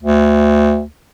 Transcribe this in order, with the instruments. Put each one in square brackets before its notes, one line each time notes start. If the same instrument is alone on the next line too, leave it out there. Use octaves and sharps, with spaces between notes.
[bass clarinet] D2